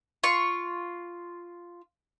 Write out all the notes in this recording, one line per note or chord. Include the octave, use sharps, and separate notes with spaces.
F4 C#6